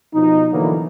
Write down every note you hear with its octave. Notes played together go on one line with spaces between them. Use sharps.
B2 F3 D#4
D3 E3 F#3 A#3 B3